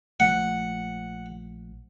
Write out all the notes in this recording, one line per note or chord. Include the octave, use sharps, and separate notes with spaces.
A#1 F3 A3 F#5